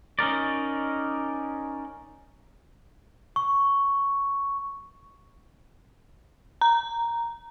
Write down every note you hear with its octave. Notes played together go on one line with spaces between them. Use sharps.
C#4 D#4 A#4 D5
C#6
A#5